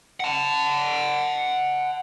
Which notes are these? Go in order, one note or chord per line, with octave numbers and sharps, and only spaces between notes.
F#5 A5